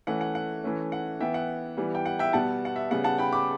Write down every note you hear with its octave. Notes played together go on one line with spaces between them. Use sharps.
E3 A3 C#4 F#5
F#5
F#5
E3 A3 C#4
F#5
E3 B3 E5 G5
F#5
E3 G3 B3
G5
F#5
E5 G5
B2 G3 B3 F#5 A5
F#5
E5
C#3 G3 B3 F#5
F#5 A5
G5 B5
B5 D6